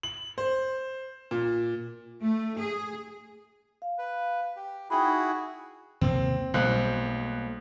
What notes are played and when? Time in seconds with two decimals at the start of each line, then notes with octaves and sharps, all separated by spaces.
0.03 F#7
0.38 C5
1.31 A#2
2.21 A3
2.57 G#4
3.82 F5
3.98 B4
4.56 G4
4.90 D#4 E4 F#4 G#4 G5 B5
6.01 D#2 C3 A#3 C4
6.54 B1 G3 A3 A#3 C5 F#6